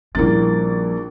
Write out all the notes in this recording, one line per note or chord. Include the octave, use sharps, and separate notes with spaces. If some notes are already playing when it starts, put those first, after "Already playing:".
A#1 F3 G3 A#3 C#4 E4 A6